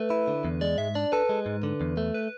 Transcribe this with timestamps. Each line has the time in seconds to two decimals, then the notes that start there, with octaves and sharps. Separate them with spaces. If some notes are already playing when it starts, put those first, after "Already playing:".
Already playing: A3 B4
0.10 E4
0.28 D3
0.45 E2
0.61 G#3 D5
0.78 G#2 E5
0.95 D4 D5
1.12 A4 B4
1.29 G#3
1.46 G#2
1.63 D3
1.81 E2
1.97 A3
2.14 B4